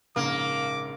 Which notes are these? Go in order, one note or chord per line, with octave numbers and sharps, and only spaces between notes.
A#1 G#2 C#3 A#3 D6